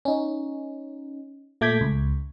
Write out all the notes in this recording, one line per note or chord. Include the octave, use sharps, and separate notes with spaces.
C#4 D#4
A#2 A3 D6 G6 G#6 B6
C#2